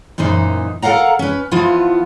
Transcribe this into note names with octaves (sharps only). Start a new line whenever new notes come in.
F#2 A#2 E3 D#4 C5
A4 A#4 D#5 F5 F#5 A#5
C#4 B4
F3 B3 E4 F4